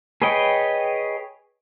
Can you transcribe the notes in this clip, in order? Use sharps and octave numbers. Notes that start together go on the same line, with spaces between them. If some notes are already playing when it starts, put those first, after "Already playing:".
G#4 B4 C#5 D#5 G5